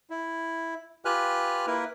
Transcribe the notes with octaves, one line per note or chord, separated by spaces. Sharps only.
E4
F4 G4 B4 G#5 F6 F#6
A#3 E4 A#4 B4